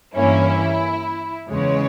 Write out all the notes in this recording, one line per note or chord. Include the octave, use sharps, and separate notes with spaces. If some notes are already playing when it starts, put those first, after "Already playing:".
G2 E3 A#3 C#4 E4
E2 C#3 G#3 C#5